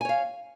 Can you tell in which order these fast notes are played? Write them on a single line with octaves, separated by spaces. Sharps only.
G#5 C#5 F5